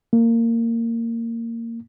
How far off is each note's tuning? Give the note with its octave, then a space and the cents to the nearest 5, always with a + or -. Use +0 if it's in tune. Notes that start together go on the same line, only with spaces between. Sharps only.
A#3 -20